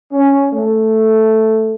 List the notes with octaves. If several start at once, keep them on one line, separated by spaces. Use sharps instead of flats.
C#4
A3